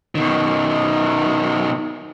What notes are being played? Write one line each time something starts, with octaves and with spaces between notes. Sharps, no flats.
B2 D#3